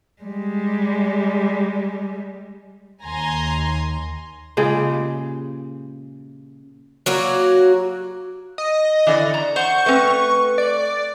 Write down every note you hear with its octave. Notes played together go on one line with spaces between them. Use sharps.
G3 G#3
D#2 G#5 A#5 C6
A#2 C#3 G#3 G4
F#3 A#3 F#4
D#5
D3 E3 D5
A#5
C5 F#5 C#6
A3 C4 B4
D5